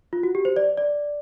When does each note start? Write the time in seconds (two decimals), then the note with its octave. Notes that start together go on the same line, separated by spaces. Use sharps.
0.13 F4
0.23 F#4
0.35 G4
0.45 C5
0.56 D5
0.77 D5